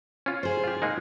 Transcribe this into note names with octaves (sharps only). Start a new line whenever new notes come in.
C#4 F4
G#4 C5
F4 G4
G#3 A#3 D#4